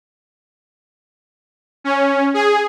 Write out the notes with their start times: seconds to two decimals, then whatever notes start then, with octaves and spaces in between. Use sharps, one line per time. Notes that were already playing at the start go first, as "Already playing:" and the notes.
1.84 C#4
2.34 G#4